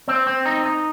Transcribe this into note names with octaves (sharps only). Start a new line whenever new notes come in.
C4
C4
D#4
D#4